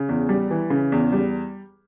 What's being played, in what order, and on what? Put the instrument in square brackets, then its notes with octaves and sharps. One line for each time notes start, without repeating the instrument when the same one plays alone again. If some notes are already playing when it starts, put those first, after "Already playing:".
Already playing: [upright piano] C#3
E2
G3
E3
C#3
E2
G3